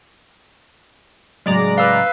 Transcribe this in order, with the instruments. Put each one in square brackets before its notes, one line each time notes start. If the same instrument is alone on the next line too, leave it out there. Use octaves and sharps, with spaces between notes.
[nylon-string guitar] A2 C#3 F#3 [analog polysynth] G#3 D5 A#5
[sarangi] B4 [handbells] F5 E6